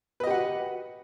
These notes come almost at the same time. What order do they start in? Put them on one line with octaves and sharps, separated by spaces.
B4 D#5 G4 F#5 F#4